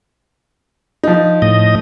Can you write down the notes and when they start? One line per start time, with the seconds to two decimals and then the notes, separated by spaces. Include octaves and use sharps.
1.03 F3 D#4
1.42 A2 D#5